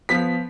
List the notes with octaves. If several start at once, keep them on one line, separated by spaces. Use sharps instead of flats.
F3 B3 B6